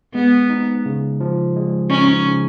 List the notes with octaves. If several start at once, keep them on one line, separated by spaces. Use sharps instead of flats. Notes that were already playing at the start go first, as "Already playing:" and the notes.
G#3 B3
D#4
C#3
F3
G#3
C#4 D#4
C#3